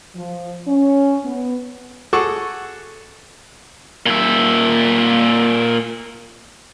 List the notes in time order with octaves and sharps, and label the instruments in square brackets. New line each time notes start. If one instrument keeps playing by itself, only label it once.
[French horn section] F3
C#4
B3
[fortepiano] F#4 G#4 A4 F#5 C#6 D6
[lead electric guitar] A#2 E5